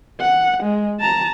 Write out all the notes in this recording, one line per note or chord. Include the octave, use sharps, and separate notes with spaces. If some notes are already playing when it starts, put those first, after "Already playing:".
F#5
G#3
A5 A#5